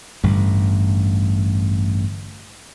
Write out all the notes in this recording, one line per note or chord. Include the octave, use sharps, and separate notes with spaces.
A1 G2 D3 G3